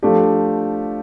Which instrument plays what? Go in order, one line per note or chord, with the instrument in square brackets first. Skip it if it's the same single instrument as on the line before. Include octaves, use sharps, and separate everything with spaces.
[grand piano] F3 A3 D4 G4